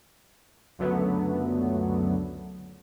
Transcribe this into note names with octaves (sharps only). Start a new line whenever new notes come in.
C#2 F#2 D3 F#3 A3 B3